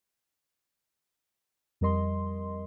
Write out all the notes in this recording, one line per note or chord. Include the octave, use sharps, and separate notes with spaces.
F2 G3 A#4 D#5 C6